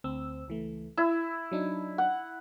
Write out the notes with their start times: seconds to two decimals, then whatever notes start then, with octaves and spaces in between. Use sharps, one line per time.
0.04 D2 C4 E6
0.48 C#2 E3 A3
0.97 E4 E6
1.52 F#3 D4 D#4
1.98 F#5